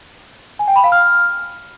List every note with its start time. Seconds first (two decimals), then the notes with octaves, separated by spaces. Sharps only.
0.59 G#5
0.68 G5
0.76 B5
0.84 F5
0.92 F6